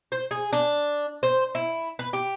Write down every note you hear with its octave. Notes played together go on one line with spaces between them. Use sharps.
C5
G#4
D4
C5
E4
B4
G4